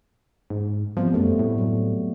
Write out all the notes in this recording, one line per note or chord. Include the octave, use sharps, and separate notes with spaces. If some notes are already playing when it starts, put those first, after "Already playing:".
G#2
F3 G3 B3 C4
F#2 A3
A2
F#3